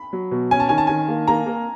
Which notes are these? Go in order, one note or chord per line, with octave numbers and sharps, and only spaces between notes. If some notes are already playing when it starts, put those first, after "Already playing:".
Already playing: B5
F#3
B2
C#4 G#5
A5
D#3 G#5
A5
D#3 G#5
A#3
A#3 A#5
A#3